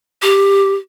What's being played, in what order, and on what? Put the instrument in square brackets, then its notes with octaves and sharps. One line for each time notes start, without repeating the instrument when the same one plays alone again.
[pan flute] G4